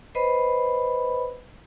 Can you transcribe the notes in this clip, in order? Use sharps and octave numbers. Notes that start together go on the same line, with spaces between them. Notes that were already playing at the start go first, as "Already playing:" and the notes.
B4 C5 D#5 B5